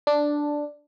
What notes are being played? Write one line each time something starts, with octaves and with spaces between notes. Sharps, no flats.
D4